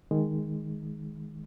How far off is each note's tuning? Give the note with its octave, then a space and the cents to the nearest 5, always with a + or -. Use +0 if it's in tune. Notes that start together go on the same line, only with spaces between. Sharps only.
D#3 +0 G#3 +0